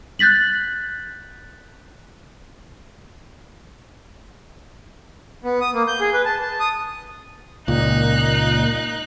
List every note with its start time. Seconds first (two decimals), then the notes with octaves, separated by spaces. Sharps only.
0.19 F#6 G6 A6 B6 F#7
5.44 B3
5.61 D#6
5.74 A#3
5.88 G6
6.01 G#4
6.14 B4
6.25 A5
6.42 A5
6.60 D#6
7.68 C#2 A#2 D#4 F#6